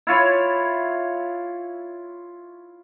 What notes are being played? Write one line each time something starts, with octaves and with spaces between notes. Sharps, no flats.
E4 F4 C#5